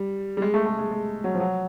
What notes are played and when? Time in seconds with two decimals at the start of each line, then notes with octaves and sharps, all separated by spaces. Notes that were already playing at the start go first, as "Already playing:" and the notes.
Already playing: G3
0.37 G3
0.42 G#3
0.54 A3
0.66 A3
0.79 G#3
0.91 G#3
1.24 F#3
1.35 F3
1.40 F#3